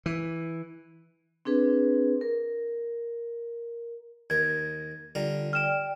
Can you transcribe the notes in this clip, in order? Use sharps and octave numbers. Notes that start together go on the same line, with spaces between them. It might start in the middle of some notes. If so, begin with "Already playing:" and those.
E3
C4 D4 G#4 B4
A#4
D#2 A#4 G#6
D3 G3 F4 A#5
D5 G5 F6 E7